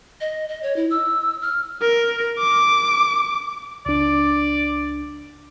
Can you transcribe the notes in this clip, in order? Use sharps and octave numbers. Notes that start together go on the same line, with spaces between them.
D#5
D#5
C#5
E4
E6
F6
A#4
D6
C#2 D4 D5